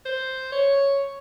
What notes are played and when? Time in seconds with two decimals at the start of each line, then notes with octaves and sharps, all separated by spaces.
0.06 C5
0.52 C#5